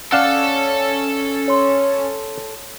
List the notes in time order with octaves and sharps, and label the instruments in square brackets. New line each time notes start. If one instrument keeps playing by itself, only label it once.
[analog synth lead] C#4 [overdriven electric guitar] A4 A5 [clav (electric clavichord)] D5 F5 F#5
[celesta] C#5 C6